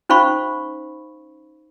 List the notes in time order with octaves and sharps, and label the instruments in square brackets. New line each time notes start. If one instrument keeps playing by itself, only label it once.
[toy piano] C#4 D#4 C5 F5 B5 C#6